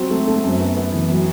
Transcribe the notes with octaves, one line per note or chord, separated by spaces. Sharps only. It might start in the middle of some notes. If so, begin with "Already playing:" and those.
Already playing: F#3 C4
A3
A3
F#2
B3
B3
E3
F#3